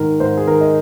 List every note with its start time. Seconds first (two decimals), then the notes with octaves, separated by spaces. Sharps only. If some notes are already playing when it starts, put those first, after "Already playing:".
Already playing: G#2 D#3 A#4
0.20 G#2 C5
0.37 G#4
0.47 D#3 A#4
0.61 D#5